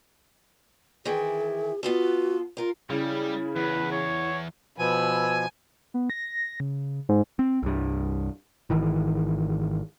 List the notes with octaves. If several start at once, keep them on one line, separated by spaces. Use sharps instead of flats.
D#3 E3 E4 G#4
B3 F4 F#4 A4
F4 A#4
C#3 G3 E4
E2 B4
C#5
B2 F3 B4 G#5 E6
B3
A#6
C#3
G#2
C4
C2 G2
G#1 D#3 E3